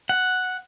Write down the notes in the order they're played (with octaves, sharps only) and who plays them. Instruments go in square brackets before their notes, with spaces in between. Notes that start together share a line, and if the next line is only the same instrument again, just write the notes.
[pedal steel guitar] F#5